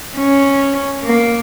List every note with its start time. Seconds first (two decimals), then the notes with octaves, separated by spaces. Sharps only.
0.17 C#4
1.04 A#3